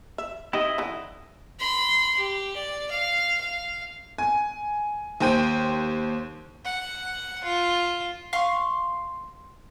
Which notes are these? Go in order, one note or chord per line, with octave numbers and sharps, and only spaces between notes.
E5
C4 D#4 E4 G4 D#5
D3 E3
B5 C6
G4
D5
F5
F5
G#5
D#2 C5 G5 D#7
F#5
F4
F5 C6 C#6